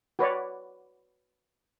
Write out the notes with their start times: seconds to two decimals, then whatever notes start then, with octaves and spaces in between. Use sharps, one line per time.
0.19 F#4 B4 C#5 D5